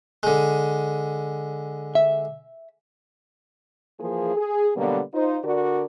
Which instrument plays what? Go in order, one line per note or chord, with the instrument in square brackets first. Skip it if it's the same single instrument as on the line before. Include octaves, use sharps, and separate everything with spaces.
[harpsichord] D3 G#3
[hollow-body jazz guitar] E5
[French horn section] E3 F3 A#3 G#4
G#4
B2 D3 F#3 G3 A#3 B3
D#4 F4 C5
D3 F#4 A#4 D5